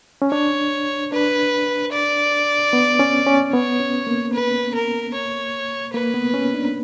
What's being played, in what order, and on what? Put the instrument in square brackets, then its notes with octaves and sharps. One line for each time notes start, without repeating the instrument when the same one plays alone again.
[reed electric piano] C#4
[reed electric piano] D4 [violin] C#5
[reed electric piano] D4 [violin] B4
[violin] D5
[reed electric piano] B3
C#4
C#4
[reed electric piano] B3 [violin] C#5
[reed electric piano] C#4
A#3
[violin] B4
A#4
C#5
[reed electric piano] A#3 [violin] B4
[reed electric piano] B3
C#4
D4